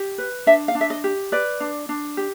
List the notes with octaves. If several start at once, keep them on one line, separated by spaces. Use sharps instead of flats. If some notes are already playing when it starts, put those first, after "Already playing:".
Already playing: G4
B4
D4 E5
F5
D4
E5
D#5
G4
B4 D5
D4
D4
G4